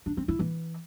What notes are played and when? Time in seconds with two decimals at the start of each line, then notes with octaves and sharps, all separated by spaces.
0.06 D4
0.17 C4
0.28 E4
0.39 E3